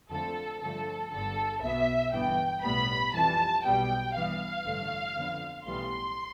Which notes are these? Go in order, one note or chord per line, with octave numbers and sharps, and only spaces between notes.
F2 D3 F3 A3 A4
G2 D3 F3 A3 A4
G1 G2 D3 A4
B1 B2 B3 E5
G1 G2 E3 B3 G5
B1 A2 G3 B3 B5
F2 E3 G3 A5
B1 B2 G3 B3 G5
G2 E3 B3 F5
A1 G2 D3 A3
F2 D3 F3 B3
B1 A2 E3 G3 B3 C6